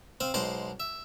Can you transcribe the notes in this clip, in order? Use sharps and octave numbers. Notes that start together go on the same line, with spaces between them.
C4 C5 F5
B1 G#3 C5 C6 D6
E5